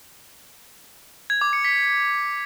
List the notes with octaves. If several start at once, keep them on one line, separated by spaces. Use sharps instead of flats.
G#6
D6
C#7
B6